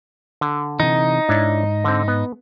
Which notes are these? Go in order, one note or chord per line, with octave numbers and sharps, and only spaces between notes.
D3
C3 E3 D#4
G#2 D4 E4 C#5
D3 C4
B3